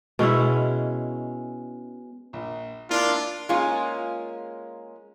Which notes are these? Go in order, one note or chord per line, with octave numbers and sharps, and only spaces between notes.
B2 G#3 C#4 E4
A#1
A#3 D4 E4 F4 A#4
G#3 A#3 C#4 F4